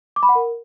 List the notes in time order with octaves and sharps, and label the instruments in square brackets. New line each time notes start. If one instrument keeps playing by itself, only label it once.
[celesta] D6
B5
F#5
A#4